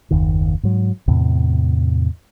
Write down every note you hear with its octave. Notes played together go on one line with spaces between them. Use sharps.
F#1 D#2 D#3
G#2 F#3
E2 A2 C3